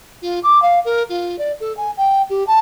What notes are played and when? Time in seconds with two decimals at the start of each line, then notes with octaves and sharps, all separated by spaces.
0.22 F4
0.43 D6
0.62 F5
0.85 A#4
1.09 F4
1.38 D5
1.60 A4
1.77 G#5
1.97 G5
2.29 G4
2.47 A5